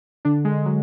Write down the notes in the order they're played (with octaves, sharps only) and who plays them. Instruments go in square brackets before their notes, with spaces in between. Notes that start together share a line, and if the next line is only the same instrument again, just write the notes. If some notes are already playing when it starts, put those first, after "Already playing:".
[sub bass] D3 [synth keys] D4
[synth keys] G#3
F#3